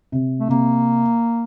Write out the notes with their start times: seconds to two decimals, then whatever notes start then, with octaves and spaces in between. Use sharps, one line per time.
0.12 C3
0.40 A3
0.49 C3 A#3